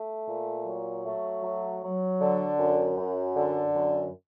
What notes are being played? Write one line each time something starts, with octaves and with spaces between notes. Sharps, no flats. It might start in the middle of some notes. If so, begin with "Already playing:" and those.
Already playing: A3
A#2
F#3
A3
F#3
F#3
D3
F#2
F#2
D3
F#2